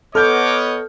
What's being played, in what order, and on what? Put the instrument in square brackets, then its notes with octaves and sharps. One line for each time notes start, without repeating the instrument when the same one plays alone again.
[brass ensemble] B3 C#5 D#5 [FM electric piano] A4 [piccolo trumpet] D6 [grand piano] F6 G6